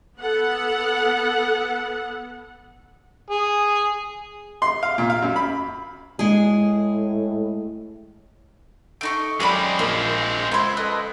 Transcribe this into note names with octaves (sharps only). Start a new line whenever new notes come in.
B3 A4 F#5
G#4
C6
F5
A#2
F5
F#2
B5
A2 G#3 G#4
A3 D#4 C#6 D7
F#2 G#3 C4 G4 D5 B5
A#1 A#3
C#2 C5 E5 B5 G#6
A4 B4 D#5